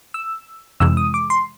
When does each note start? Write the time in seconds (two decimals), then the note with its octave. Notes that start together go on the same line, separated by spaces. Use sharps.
0.14 E6
0.80 F2 C3 E3 G#3 E6
0.97 D#6
1.14 D6
1.30 C6